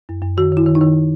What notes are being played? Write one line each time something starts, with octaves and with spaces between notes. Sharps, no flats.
F#2
F#2
D#3 F#4
D#3 E4
D#3
D#4
D#3